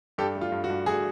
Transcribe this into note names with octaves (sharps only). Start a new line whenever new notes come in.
G2 G4 A4
A3
F4
G2
F#4
G2
A3 F#4 G#4